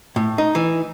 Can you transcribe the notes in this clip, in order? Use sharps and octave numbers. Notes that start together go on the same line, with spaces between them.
A2
D#4
E3